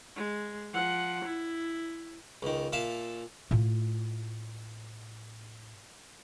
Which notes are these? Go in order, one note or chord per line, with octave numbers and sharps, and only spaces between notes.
G#3
F3 F#5
E4
C#2 D#3
A#2 E5 F5 A5
A2 F4